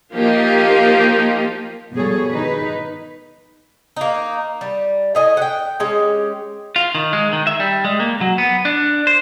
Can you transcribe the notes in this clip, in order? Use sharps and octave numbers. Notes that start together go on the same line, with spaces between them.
F3 A#3 D#4 G4
B2 F3 G3 G#4 A4 C#5
D#3 D#4 B4
A#3 D#4
G3
A2 D#5 G#5
F#5 G5
G#3 C#4 G4
F4
D#3
G#3
D#3
E5
G3
G#3
A#3
F#3
B3
D4
C5